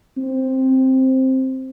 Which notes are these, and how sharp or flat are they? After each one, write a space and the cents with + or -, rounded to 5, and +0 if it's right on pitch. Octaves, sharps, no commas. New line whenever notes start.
C4 +5